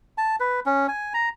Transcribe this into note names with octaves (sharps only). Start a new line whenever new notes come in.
A5
B4
C#4
G#5
A#5